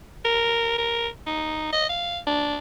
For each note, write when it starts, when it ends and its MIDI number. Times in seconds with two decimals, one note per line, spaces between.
0.25 0.74 70
0.78 1.08 70
1.27 1.71 63
1.73 1.89 75
1.89 2.19 77
2.27 2.57 62